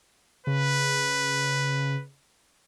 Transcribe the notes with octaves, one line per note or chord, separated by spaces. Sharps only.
C#3 B4